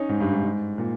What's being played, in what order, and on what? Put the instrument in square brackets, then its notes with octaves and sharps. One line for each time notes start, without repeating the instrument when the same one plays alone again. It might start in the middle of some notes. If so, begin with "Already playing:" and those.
Already playing: [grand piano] C#4 D#4
G#2
G2
G#2
G#2
A#2